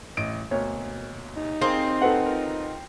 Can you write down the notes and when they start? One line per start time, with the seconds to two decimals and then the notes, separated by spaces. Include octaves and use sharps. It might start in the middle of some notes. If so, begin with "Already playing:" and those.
0.17 A1 D#5 D7
0.51 D2 B2 A#3 C#5
1.37 D#4
1.61 C4 G#4 A#4 F5
2.02 A4 B4 F#5
2.26 F4 A#4